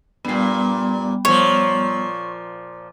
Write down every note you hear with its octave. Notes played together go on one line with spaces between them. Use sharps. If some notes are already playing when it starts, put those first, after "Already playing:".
G2 A#2 G3 B3
A#2 F3 C#5